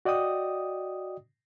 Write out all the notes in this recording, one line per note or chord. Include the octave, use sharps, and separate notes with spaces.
F#4 D5 D#5 G5 D#6